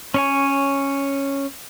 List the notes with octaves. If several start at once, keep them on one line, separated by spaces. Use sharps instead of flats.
C#4 C#5 G#5